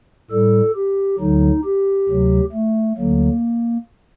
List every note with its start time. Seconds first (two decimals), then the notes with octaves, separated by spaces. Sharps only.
0.31 A2 G3 A4
0.75 G4
1.19 D2 D3 F#3 D#4
1.64 G4
2.09 D2 C3 F#3
2.53 A3
2.97 D2 D3 F#3 A#3